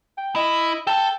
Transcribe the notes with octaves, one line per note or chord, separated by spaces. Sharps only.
G5
E4 D#5
A4 G5 A5